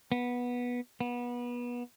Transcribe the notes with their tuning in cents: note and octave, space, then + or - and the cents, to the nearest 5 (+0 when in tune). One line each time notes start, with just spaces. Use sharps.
B3 -15
B3 -25